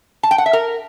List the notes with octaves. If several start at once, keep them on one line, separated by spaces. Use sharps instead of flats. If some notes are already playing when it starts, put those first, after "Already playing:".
A5
G5
F#5
E5
A#4